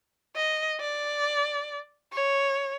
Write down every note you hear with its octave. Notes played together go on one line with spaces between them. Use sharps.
D#5
D5
C#5